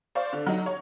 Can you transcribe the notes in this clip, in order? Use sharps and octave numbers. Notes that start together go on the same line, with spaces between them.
C5 D5 F5 C#6
D3
F#3 D#4
C#5